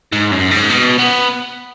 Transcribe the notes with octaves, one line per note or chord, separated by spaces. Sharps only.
G#2
F#2
G#2
B2
B3